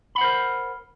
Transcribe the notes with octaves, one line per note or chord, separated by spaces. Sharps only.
A#4 C5 F#5 B5